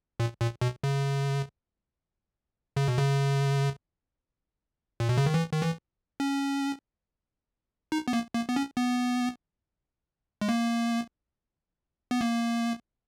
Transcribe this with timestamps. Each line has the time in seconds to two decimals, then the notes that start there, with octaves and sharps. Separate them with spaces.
0.20 A#2
0.41 A#2
0.61 B2
0.84 C#3
2.77 C#3
2.88 B2
2.98 C#3
5.00 A#2
5.09 B2
5.17 C#3
5.26 D#3
5.34 E3
5.52 D#3
5.62 E3
6.20 C#4
7.92 D#4
8.08 B3
8.13 A#3
8.35 A#3
8.49 B3
8.56 C#4
8.77 B3
10.41 G#3
10.49 A#3
12.11 B3
12.21 A#3